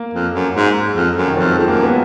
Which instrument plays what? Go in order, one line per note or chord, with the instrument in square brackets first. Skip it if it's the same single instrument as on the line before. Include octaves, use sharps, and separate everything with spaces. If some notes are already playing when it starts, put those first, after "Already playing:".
Already playing: [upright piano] A#3
[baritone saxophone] F2
F#2
G#2
F2
F#2
[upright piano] D#3
[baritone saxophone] F2 [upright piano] F3
[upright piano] G#3
[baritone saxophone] F2
[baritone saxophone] F#2 [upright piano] A#3
[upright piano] B3